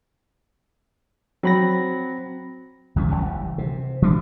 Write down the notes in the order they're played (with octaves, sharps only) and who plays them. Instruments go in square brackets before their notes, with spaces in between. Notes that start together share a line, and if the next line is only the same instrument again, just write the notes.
[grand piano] F#3 [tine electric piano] C4 B5 A#6
[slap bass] D2 F3 A#3 C#4
F#1 D2 E3 G3
C3
E3 D4